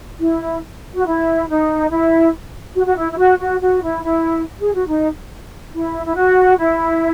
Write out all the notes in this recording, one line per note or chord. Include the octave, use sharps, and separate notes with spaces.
E4
F#4
E4
D#4
E4
F#4
F#4
E4
E4
F#4
F#4
F#4
E4
E4
G#4
F#4
D#4
E4
E4
F#4
E4